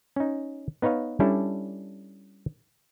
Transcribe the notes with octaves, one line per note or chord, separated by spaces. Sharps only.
C#4 D#4
B3 D#4 B4 C#5 F5
G3 C#4 D4 E4 A4